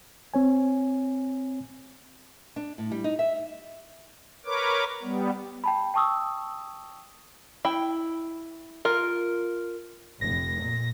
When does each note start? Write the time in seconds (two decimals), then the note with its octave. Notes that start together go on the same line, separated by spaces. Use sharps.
0.34 C4 C#5 G#5
2.56 D4
2.78 A2
2.91 G3
3.04 D#4
3.19 E5
4.46 A#4 B4 C#5 D6
5.03 G3 B3
5.64 G5 A5 B5
5.94 G5 A5 C#6 D#6 E6
7.65 E4 G5
8.85 F4 A#4
10.21 F1 A#6
10.61 A#2